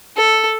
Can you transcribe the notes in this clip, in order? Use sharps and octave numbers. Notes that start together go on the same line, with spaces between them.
A4